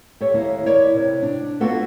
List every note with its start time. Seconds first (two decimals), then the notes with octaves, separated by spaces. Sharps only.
0.20 G4 A4 C#5
0.33 D#2 A#3 E4
0.66 E4 A#4 C#5 D5
0.94 C3
1.22 D4
1.60 A#3 B3 F4 F#4 A4 B4